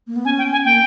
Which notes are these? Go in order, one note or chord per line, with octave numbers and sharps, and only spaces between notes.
A#3
B3
C#4 G#5
G5
G#5
A#3 G5